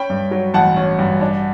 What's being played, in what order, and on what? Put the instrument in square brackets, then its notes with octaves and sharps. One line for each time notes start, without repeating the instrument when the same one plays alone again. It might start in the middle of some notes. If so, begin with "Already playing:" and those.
Already playing: [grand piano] C#4 G5 B5
G2
F#3
A1 F#5 A5
C#4
G2
D4